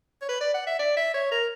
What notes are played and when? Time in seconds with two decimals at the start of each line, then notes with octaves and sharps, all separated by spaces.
0.21 C#5
0.28 B4
0.41 D5
0.54 F#5
0.67 E5
0.79 D5
0.96 E5
1.14 C#5
1.31 A#4